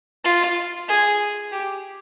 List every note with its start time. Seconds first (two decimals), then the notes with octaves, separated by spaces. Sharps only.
0.24 F4
0.88 G#4
1.52 G4